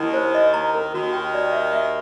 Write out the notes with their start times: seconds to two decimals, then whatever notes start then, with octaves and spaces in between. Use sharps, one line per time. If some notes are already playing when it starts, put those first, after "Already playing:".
Already playing: D#2 D#3 E4
0.14 C5
0.35 D#5
0.54 A#5
0.74 A#4
0.93 D#2 D#3 F#4
1.13 G5
1.34 D5
1.53 E5
1.73 E5